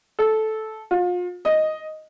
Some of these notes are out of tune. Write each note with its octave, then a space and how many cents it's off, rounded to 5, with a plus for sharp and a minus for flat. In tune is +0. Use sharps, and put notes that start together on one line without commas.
A4 -10
F4 +35
D#5 +0